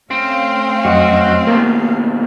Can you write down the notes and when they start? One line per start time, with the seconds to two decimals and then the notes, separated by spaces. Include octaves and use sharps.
0.11 A3 C4 C#4 F5
0.85 F2 F#3 F#4 D#5
1.47 D#2 B2 A#3